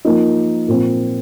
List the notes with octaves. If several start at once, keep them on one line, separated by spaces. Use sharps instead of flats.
F3 A#3 D#4
A#2 F3 C4